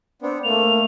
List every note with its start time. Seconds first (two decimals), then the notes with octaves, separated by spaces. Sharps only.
0.22 B3 C4 D4
0.44 A3 A#3 F7